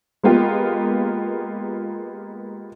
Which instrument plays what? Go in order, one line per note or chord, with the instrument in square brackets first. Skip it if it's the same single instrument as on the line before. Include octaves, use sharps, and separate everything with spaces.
[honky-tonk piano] G#3 A#3 B3 F4 G4